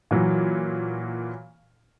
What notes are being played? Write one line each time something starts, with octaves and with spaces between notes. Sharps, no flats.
A#2 E3 F#3